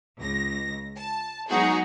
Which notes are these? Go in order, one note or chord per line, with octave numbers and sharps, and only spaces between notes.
C#2 A#6
A5
F#3 G#3 B3 D#4 F#4 G#4